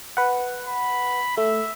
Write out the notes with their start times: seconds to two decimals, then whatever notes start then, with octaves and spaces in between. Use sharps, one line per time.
0.17 B4 F#5
0.67 B5
1.37 A3 E5